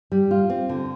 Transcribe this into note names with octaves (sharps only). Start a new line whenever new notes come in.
G3
F4
C4
D3